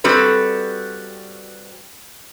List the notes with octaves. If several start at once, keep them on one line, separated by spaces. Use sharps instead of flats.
G3 C4 F#4 A4 B4